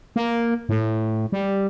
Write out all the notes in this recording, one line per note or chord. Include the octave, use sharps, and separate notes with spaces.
A#3
A2
G3